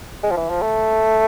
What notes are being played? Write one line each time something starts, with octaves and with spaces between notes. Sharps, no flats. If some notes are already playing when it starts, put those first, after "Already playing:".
G#3
F3
E3
F3
A3